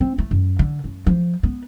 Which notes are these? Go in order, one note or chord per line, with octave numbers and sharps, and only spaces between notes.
C4
A3
F#2
D3
F#2
F3
B3